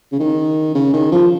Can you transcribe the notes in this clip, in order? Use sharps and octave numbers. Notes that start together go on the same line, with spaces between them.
C#3
D#3
C#3
D#3
F3